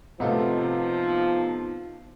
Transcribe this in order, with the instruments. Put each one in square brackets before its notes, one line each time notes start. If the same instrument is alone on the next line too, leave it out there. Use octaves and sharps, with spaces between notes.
[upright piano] C3 A3 [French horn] F3 [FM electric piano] B3 D#4 F4